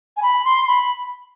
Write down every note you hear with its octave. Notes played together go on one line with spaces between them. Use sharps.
G#5
B5
C6
B5